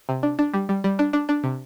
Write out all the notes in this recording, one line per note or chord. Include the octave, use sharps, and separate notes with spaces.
C3
D4
D4
G3
G3
G3
D4
D4
D4
C3